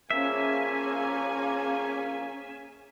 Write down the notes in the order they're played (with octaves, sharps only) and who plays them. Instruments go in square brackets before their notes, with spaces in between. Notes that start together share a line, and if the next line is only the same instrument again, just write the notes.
[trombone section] F3 A#3 [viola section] C#4 G#4 G#5 [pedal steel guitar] E5